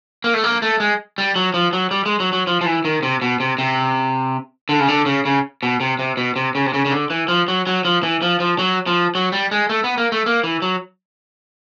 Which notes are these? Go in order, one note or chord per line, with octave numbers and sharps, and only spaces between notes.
A#3
A3
A#3
A3
G#3
G3
F#3
F3
F#3
G3
G#3
F#3
F#3
F3
F3
E3
D#3
C3
B2
C3
C3
D3
C#3
D3
C#3
C#3
B2
C3
C3
B2
C3
C#3
C3
C#3
C#3
D3
E3
F3
F#3
F#3
F3
E3
F3
F3
F#3
F3
F#3
G3
G#3
A3
B3
A#3
A3
A#3
E3
F#3